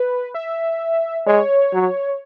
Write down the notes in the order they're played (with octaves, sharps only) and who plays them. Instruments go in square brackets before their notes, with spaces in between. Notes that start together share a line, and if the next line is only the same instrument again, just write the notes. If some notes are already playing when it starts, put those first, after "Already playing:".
Already playing: [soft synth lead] B4
E5
[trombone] G#3 [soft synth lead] C#5
[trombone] F#3